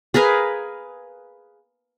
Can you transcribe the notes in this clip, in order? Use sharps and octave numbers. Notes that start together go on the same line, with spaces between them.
G#4 A#4 B4 F5